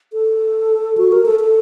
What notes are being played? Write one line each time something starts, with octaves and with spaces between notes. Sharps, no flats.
A4
F#4
A#4
A4
A4